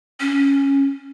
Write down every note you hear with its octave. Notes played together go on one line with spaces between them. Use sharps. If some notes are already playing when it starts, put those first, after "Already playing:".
C#4